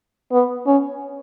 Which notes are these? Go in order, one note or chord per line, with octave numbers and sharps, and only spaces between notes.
B3
C#4